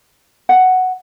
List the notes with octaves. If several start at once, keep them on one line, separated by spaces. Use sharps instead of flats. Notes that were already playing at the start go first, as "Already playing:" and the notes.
F#5